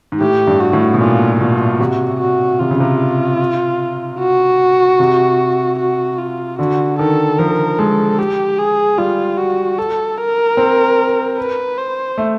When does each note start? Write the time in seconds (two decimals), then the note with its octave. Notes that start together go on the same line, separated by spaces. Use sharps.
0.12 G#2
0.21 A2 G4
0.47 G2
0.60 F#4
0.73 A2
0.94 B2
1.00 A#2 F4
1.40 B2 F4
1.79 C3 F#4
2.20 F#4
2.60 C3 F4
2.71 C#3
2.80 C3
4.19 F#4
4.99 C3
5.79 F#4
6.18 F4
6.59 D3 F#4
6.99 D#3 A4
7.39 F3 A#4
7.79 G#3 A4
8.18 G4
8.58 G#4
8.98 G3 F4
9.38 F#4
9.78 A4
10.18 A#4
10.57 C4
11.38 B4
11.78 C5
12.18 A3